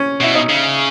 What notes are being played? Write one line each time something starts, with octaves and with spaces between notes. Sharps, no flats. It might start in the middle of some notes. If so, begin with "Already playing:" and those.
Already playing: C#4
B2 E4
D#4
C#3